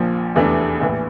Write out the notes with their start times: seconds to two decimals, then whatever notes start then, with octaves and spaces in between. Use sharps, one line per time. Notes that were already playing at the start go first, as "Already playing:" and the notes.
Already playing: A#1 A#2 F3
0.35 F1 E2 E3 A3 D4
0.81 A#1 A2 E3